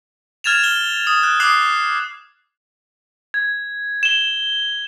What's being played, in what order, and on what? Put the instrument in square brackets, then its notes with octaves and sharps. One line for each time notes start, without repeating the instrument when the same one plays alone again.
[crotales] F6 G#6 A6 E7 F7
F6 G7
D#6
F#6
D6 D#6 F#6 C7
G#6
E7 G7